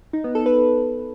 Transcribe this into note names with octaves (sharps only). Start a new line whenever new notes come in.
D#4
B3
A4
B4